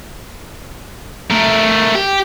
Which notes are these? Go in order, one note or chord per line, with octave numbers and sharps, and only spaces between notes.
A3 A#4
G4